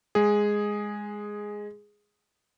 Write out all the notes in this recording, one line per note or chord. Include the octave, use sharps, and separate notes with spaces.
G#3 G#4